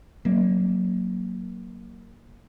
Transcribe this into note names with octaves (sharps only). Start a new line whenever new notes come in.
F#3 A#3 C#4